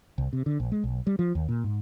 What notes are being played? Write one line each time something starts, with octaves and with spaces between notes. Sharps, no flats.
C2
C3
D3
A#1
G#3
B1
G3
F3
D#2
A#2
G#2